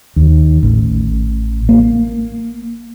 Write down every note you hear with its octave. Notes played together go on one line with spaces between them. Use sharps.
D#2
A1
A#3